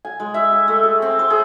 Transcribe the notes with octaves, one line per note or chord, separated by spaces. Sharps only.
G#5
G#3
E5
G#5
A3
G#4
C4
C5
G#4